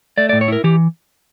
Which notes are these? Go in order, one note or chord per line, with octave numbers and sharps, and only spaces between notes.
A3 D5
D5
A2
C#5
E4 A#4
E3 G4